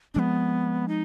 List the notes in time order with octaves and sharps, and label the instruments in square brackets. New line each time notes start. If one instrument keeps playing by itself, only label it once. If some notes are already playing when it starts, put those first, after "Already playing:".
[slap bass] F3 G#3 C4 [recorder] B3 D4
[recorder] D#4